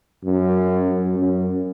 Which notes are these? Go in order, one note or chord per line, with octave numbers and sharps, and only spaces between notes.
F#2
F#2
F#2